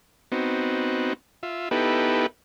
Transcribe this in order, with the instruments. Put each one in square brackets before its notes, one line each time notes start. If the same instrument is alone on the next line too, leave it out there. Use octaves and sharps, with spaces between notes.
[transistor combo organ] B3 C4 D#4 F#4
F4 E5
B3 D#4 E4 G4 A4 B4